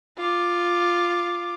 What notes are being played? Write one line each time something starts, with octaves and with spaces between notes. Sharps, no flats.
F4 D6